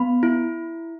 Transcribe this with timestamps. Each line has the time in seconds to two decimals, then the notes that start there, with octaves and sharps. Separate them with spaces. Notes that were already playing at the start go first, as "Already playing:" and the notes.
Already playing: B3 B5
0.23 E4